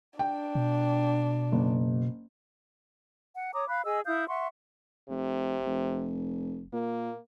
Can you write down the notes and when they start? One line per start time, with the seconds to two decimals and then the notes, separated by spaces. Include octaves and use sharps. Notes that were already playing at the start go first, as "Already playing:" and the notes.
0.19 D4 G5
0.55 B2
1.52 F#1
3.35 F#5
3.54 C#5 A#5 D6 D#6
3.68 F5 B5 F#6
3.84 G#4 D#5 G#5 E6
4.05 E4 F5 D#6 G6
4.28 E5 F#5 C6 C#6
5.09 F1 C3
5.66 F1
6.73 A#2 A#3